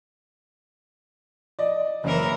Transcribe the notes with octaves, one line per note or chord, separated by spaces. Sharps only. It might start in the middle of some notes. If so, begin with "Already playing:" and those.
D5 D#5
F#1 C#3 E3 A#4